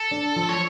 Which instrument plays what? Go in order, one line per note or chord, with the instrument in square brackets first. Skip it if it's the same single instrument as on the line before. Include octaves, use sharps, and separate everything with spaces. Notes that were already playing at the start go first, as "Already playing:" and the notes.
Already playing: [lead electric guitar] A4
[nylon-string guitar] D4
F3
[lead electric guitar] C#5